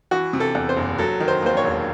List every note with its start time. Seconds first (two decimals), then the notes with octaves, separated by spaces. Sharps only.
0.11 E3 F#4
0.33 C3
0.40 A4
0.55 E2
0.69 C5
0.77 F#1
0.98 F#3 A4
1.20 D#3
1.28 C5
1.42 D#2 C5
1.57 C#5
1.64 E1